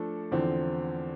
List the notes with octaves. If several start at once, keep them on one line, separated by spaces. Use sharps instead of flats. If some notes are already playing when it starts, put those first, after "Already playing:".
Already playing: F3 A3 D4 A4
E2 D3 F3 C4